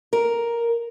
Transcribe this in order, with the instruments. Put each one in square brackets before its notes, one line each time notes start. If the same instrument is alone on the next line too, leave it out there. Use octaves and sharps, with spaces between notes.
[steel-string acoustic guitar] A#4